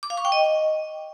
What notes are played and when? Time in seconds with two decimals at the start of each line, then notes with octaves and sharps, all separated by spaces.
0.03 D6
0.10 F5
0.17 C#6
0.25 G5
0.32 D#5